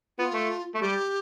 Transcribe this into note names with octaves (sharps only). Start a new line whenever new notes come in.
B3 F4
A3
A3
G3 G4